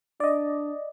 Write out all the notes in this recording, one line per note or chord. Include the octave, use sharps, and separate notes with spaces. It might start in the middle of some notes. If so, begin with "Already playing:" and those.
D4 D5 D#5